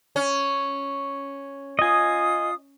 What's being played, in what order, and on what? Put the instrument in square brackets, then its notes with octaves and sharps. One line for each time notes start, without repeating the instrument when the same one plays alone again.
[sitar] C#4
[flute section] F4 D#6 [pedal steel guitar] D#5 G#5